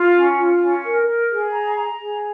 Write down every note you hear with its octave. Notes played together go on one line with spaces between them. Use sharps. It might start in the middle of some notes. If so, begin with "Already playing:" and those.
Already playing: F4
C#4
F4
C#4
A#4
A#4
G#4
A#5
A#5
G#4